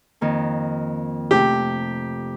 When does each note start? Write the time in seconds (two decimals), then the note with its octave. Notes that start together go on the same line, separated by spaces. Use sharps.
0.21 F2 D#3 A#3
1.31 C3 A3 G4